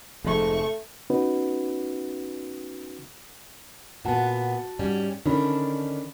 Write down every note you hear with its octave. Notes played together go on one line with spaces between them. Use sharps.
F1 F2 G#2 A3 C#6
B3 C#4 D#4 F#4 B4
A#2 B3 F#4 F#5 A5
G#2 G3 C#4
D3 D#3 C#4 D4 B5